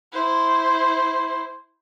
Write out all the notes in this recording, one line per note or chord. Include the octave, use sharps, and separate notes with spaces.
E4 C5